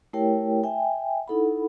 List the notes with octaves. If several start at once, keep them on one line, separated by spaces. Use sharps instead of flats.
A3 E4 G4 A#4 C#5 G5
E5 G5 G#5
D#4 E4 A4 F#5 B5